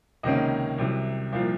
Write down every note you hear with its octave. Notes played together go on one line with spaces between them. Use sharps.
C#2 C3 D#3 A#3 C#4 D#5
C2 C3 F#3
C2 A#2 F3 F5